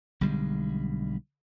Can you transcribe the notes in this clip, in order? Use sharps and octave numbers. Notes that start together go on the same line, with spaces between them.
B1 D3 G3 G#3